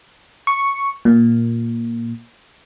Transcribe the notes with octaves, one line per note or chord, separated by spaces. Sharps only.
C#6
A#2